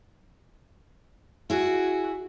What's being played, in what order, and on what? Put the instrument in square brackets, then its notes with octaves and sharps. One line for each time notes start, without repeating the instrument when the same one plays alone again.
[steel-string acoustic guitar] E4 G#4 [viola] F#4